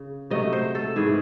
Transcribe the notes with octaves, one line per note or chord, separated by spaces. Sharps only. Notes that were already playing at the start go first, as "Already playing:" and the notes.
Already playing: C#3
C3 F#3 A3 D#5
C5
A4
G#2 E3 A3 G#4